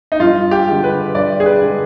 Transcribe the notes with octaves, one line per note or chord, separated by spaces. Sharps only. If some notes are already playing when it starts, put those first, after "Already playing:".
D#4
G2 F4
G4
D3 G#3
B4
G2 D5
G#4
B4
D3 G#3